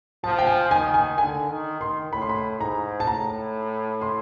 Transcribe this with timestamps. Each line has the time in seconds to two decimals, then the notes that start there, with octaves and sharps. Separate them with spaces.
0.24 F3 A5
0.39 G5
0.47 G#5
0.71 D#3 G#5
0.94 G#5
1.18 D3 G#5
1.50 D#3
1.81 D#3 C6
2.12 A2 B5
2.22 C6
2.29 B5
2.60 G#2 A#5
3.00 A5
3.07 A2 A#5
4.01 C6